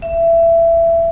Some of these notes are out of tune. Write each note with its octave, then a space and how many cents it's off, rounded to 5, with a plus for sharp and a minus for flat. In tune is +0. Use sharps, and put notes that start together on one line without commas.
E5 +20